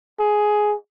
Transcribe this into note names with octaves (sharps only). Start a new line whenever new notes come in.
G#4